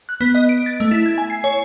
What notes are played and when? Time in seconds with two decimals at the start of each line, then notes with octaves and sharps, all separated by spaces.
0.09 F#6
0.21 B3
0.35 D#5
0.49 D7
0.66 A6
0.80 A3
0.91 E4
1.06 G#6
1.18 G#5
1.30 C7
1.44 C#5